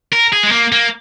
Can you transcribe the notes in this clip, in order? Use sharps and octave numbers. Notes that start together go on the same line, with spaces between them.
A#4
G#4
G#3
A#3
A#3